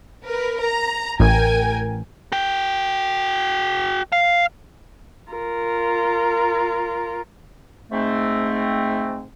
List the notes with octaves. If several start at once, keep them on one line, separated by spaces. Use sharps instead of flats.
A#4 B4
A#5
A1 A#4 G5 G#5
F#4 G5
F5
F4 A#4
G#2 A3 C4